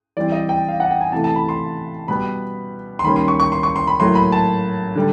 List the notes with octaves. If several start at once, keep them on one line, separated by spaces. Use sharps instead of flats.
E3 G3 C4 D5
D#5
G5
F5
F#5
G5
G#5
C3 E3 A3 A5
A5
B5
C6
B2 G3 B3 B5
C6
D#3 G3 A#3 C#4 B5
C6
C#6
C#6
C6
C#6
C6
B5
A2 F#3 A#3 C6
B5
A5
D3 G3